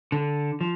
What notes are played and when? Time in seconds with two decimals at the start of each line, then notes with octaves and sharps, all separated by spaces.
0.12 D3
0.61 F3